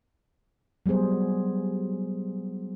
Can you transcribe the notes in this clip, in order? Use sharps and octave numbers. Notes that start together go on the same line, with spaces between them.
F#3 G3 B3 G#4 C5